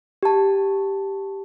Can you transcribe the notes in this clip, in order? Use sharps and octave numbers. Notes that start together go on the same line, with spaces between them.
G4 A5